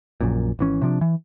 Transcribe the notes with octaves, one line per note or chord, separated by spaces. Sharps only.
A#1 F#2 A#2
G#1 E3 C#4
C3 F3 D4
E3